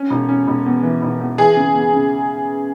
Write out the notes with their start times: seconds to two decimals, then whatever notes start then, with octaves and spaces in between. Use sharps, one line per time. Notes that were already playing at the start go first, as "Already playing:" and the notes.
Already playing: C#4
0.10 E1
0.29 C#4
0.47 E1
0.66 E2
0.83 E3
1.02 E1
1.20 E2
1.38 E3 G#4
1.57 C#3
1.74 E2
1.93 C#3